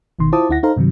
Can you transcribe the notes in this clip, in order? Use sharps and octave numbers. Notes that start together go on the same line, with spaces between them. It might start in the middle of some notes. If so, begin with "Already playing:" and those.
G#1 B2 D#3 C6
E4 F4 C5 A5 D6 D#6
D2 E4 F#5 A#6
D#4 A4 C5 F5 A#5
G2 C3 D#3 F#3